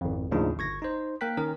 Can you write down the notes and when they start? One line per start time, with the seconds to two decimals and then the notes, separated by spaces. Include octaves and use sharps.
0.01 G#1 F2
0.31 D#2 A2 C#3 F3 D4 D#4
0.58 G1 C#6 G#6 A#6
0.82 D#4 C5
1.21 A#3 A#4 G5 F#6 B6
1.37 D#3 C#4 A#4